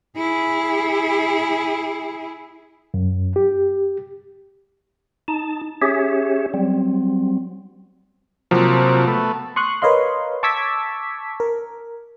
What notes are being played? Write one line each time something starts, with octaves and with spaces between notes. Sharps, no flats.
E4 G#4
F#2
G4
D#4 A5
C#4 G4 G#4 C#5 E5
F#3 G3 C4
C3 F3 F#3 A#3
A3 B3
C6 C#6 D#6 F#6
A#4 B4 C#5 D#5 F5 C6
A5 C#6 D6 E6 G#6 B6
A#4